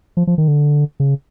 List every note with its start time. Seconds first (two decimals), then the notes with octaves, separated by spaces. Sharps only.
0.17 F3
0.27 F3
0.38 D#3
0.48 D3
1.00 C#3